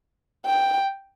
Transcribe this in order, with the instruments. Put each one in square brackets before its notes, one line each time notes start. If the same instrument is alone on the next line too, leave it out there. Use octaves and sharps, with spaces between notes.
[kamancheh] G5